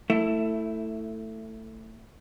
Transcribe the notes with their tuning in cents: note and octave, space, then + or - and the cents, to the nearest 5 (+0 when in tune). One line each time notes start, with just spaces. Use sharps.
A3 +15 E4 +0